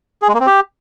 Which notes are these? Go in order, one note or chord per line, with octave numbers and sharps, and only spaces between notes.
G#4
G#3
A#3
C4
G4